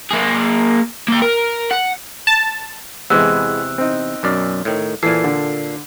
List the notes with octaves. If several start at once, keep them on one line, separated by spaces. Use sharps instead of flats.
A#3 G#4
A#3 G5
A#4
F#5
A5
E2 C3 E3 G#3 B3 E6 F#6
C4 D#4
B1 F#2 D5
A2 D#3
A#2 E3 A4 C7
D3